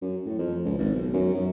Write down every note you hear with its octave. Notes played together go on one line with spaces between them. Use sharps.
F#2
A2
F2
C#2
G#1
B1
F#2
F#2